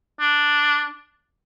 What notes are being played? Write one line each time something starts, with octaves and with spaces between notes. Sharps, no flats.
D4